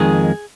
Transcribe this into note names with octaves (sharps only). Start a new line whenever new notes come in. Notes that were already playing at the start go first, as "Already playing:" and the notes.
Already playing: F2 D#3 G#3 G#4